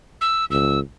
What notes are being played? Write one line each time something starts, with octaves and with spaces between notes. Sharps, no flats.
E6
C#2 E6